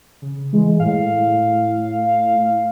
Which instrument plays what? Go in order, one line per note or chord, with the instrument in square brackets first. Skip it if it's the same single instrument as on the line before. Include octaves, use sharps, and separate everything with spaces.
[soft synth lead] C#3
[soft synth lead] E3 [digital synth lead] G#3
[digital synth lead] A2 [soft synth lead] F5